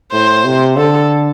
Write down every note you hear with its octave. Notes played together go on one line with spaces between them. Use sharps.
A2 C5
C3
D3 A4